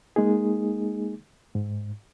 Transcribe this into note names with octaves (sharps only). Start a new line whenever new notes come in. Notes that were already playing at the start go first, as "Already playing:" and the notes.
G#3 A#3 D#4 G#4
G#2